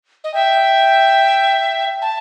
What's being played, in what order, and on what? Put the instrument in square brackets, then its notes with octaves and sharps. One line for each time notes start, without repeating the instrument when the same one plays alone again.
[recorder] D#5
[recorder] E5 [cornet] G5
[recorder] A5